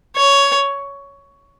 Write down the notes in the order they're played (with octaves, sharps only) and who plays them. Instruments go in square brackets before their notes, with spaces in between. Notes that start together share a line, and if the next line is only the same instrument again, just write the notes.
[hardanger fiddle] C#5